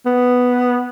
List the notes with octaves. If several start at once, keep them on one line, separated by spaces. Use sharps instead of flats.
B3